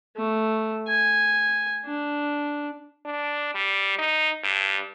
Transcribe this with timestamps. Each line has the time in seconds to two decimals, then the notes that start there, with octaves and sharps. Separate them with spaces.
0.16 A3
0.88 G#5
1.86 D4
3.06 D4
3.55 G3
3.99 D#4
4.44 G2